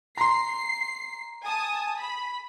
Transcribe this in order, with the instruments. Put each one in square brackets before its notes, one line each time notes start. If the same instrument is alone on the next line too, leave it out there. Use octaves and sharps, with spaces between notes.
[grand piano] A#5 C6 [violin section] C7
[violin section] G#5 A5 D#6
B5